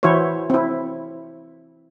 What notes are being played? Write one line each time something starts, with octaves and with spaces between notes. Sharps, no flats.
E3 E4 F#4 C5 C#5
C4 E4